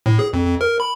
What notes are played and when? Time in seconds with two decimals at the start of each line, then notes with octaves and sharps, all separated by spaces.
0.06 A2
0.19 G#4
0.33 F2
0.45 F2
0.61 A#4
0.80 B5